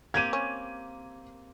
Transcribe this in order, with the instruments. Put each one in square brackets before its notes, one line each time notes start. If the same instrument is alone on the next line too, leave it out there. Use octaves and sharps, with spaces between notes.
[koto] A#3 C4 G4 [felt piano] G#6 D#7
[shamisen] C#4